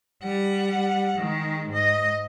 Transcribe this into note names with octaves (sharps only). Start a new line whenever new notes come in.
G3 F#5
D#3 G#3
G#2 D#5